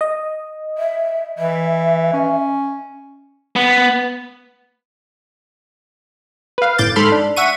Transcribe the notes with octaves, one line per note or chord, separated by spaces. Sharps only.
D#5
E5
E3 E5
C#4
B3
B4 F5
G1 A2 D6 G6 A6
G#2 A4 B5 C6 F6
D4
E5 F#5 C#6 D#7